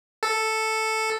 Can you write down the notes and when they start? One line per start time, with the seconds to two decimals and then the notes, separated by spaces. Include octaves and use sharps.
0.23 A4